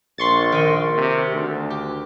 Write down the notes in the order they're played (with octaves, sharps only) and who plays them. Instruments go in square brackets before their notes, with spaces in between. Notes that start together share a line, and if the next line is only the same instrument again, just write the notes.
[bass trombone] A#1 [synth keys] C6 C#6 A6
[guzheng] D#3 D#5
[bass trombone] C3
D2
[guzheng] G4